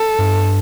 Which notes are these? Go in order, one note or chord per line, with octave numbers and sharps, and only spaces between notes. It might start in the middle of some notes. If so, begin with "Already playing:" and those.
Already playing: A4
G2